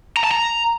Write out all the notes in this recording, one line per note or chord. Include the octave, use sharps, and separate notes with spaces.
A#5
A5
A#5